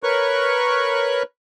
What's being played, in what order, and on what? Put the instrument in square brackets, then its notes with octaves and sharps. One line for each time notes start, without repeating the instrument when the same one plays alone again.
[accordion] A#4 B4 C#5 C#6 F#6